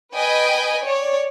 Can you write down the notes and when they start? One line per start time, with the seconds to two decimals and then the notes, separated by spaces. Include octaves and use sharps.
0.14 B4 D#5 G5 G#5
0.82 C#5 D5